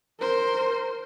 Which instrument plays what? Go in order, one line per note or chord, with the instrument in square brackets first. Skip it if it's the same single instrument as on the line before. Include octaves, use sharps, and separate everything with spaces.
[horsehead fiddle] A#4 C5